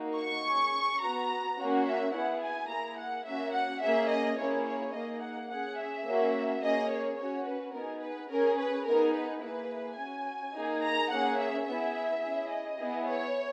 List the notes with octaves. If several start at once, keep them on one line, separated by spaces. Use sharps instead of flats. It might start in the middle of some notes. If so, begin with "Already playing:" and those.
Already playing: A#3 D#4 F#4
C#6
C#4 G#4
B3 F#4 A#5
A#3 C#4 F#4
E5
B3 E4 G#4 F#5
G#5
A#3 E4 G#4 A#5
F#5
A#3 C#4 F#4 E5
F#5
A#3 C#4 G#4 E5
D#5
A#3 C#4 E4 G#4 C#5
C#5
A#3 D#4 G#4 D#5
F#5
C#4 G#4 F#5
E5
A#3 C#4 F#4
A#3 C#4 G#4 D#5
C#5
C#4 F#4 C#5
B4
B3 D#4 G#4 A#4
B4
C#4 G#4 A#4
B4
B3 D#4 G#4 A#4
B4
A#3 E4 G#4 B4
C#4 F#4 G#5
A#3 D#4 G#4
A#5
A#3 C#4 G#4 F#5
E5
B3 E4 G#4 E5
C#4 E4 G#4
D#5
B3 E4 G#4
C#5